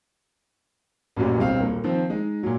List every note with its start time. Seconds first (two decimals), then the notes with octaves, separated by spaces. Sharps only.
1.16 A1 F#2 A#2 F#3 G3
1.37 D1 B1 G2 C4 F5
1.60 D#1 A#3
1.84 D#3 F3 C4
2.10 G#3 D#4
2.43 A#2 F#3